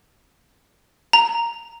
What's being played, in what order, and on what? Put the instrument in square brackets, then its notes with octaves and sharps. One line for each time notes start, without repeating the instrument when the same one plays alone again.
[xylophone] A#5